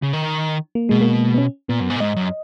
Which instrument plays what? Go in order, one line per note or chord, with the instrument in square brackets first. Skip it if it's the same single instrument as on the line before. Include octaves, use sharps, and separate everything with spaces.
[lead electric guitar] C#3
D#3
[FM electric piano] A#3
[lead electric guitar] B2 [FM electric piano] G#3
[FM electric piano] A#3
B3
C#4
[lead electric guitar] A#2 [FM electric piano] B3
[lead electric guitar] F#2
G#2
A#2
[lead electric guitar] G#2 [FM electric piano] D#5
[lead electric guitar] F#2